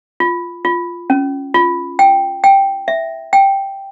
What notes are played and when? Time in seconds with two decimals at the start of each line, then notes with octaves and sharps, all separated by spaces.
0.20 F4
0.65 F4
1.10 C#4
1.54 F4
1.99 G5
2.44 G5
2.88 E5
3.33 G5